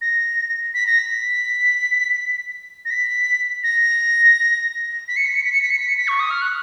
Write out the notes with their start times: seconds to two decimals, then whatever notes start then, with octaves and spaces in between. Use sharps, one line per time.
0.01 A#6
0.74 B6
0.86 A#6
0.99 B6
2.85 A#6
2.90 B6
3.63 A#6
5.08 B6
5.16 C#7
5.26 B6
5.34 C#7
5.44 B6
5.52 C#7
5.62 B6
5.70 C#7
5.79 B6
5.88 C#7
5.97 B6
6.08 C#6
6.20 D#6
6.30 F6
6.41 F#6